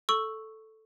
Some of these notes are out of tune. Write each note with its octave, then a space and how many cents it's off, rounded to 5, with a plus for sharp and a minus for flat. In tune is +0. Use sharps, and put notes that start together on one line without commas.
A4 +0 C#6 +0 E6 +0